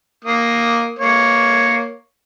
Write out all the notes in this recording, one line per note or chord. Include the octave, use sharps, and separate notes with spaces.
A#3 D#6
A#3 C#5